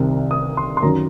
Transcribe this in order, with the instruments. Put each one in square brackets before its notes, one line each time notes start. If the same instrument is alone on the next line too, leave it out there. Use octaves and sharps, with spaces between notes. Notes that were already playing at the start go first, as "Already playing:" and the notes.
Already playing: [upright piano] C2 C3 D#3
D#6
C6
C6
F#2 D#3 F#3 A#5